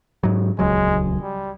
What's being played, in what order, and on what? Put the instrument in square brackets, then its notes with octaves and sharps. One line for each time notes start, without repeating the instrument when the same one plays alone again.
[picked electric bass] G#2 F#3
[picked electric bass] D#1 C#2 F#3 [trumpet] G#3
[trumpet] G3